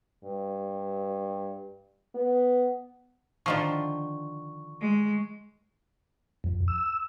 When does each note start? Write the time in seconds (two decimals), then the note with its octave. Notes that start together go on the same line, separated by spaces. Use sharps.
0.25 G2
2.15 B3
3.46 D3 D#3 F3 C#6
4.81 G#3
6.44 F2
6.68 E6